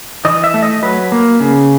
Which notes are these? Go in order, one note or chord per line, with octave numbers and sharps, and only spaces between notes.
E3 D#5
E5
A3
D#5
F#3 B4
A#3
C#3